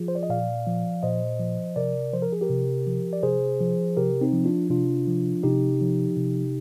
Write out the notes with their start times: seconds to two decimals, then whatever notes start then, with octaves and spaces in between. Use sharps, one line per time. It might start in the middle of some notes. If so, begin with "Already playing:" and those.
Already playing: F3 F4 G#4
0.08 C5
0.15 D5
0.23 D#5
0.29 A#2 D5 F5
0.66 F3
1.03 A#2 C5 D#5
1.39 F3
1.76 C3 A#4 D5
2.13 F3 C5
2.22 A#4
2.32 G#4
2.41 G4 A#4
2.49 C3
2.87 F3
3.13 D5
3.23 C3 G#4 C5
3.60 F3
3.97 C3 G4 A#4
4.21 C4 D#4
4.33 F3
4.45 D4 F4
4.70 C3 D4 F4
5.07 F3
5.44 C3 D#4 G4
5.81 F3
6.17 C3